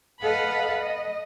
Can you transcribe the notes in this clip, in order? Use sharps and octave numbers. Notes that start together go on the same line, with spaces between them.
A4 B4 D#5 F5 F#5 B5
D#5